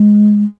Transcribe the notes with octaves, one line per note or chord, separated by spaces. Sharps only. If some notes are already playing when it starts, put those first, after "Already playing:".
Already playing: G#3